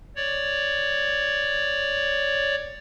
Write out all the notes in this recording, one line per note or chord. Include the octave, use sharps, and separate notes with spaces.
C#5 D5